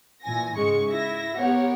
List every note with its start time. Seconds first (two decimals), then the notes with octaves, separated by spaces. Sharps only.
0.22 A#2 E3 G#5 A#6
0.56 G#2 C#3 G#3 C#6 C#7
0.89 E4 E5 A#6
1.36 B3 G4 A#4 C#5 F#5